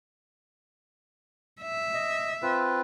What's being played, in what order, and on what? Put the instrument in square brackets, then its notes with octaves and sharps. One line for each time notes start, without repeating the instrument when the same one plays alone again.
[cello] E5
[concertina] D#5
C4 F4 B4